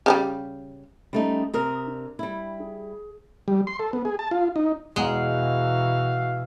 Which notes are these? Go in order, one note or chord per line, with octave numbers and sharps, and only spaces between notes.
C#3 F3 G3
G3 A3 C#4 D#4
C3 A#4 D#6
D4
G3 E4
G#4
G3
C6
A4
B3
G#4
A5
F4
D#4
E2 B2 E3 G#3 F#4 F5 F#5 A#5